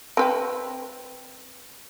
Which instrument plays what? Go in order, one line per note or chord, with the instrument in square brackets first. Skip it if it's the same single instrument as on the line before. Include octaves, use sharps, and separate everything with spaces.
[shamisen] C4 B4 G5